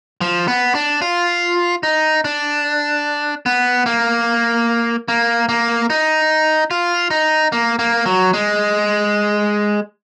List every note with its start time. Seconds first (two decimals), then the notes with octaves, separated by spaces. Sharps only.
0.21 F3
0.48 B3
0.75 D4
1.02 F4
1.83 D#4
2.24 D4
3.46 B3
3.86 A#3
5.08 A#3
5.49 A#3
5.90 D#4
6.71 F4
7.11 D#4
7.52 A#3
7.79 A#3
8.06 F#3
8.33 G#3